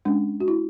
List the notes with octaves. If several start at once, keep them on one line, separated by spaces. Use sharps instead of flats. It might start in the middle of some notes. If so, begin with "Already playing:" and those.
G#3 C#4 D4
F#4
E4